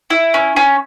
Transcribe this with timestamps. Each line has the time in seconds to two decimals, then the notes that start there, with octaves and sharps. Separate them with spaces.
0.10 E4
0.34 C#4
0.56 C#4